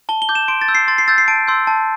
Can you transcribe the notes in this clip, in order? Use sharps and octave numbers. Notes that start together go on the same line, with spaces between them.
A5 G7
G7
D6 G6
E7
C6 D7
A6
E6 G6
C7
C6 A6
C7
E6 G6 A6
C7
A5 D7
C6 E6 G6
A5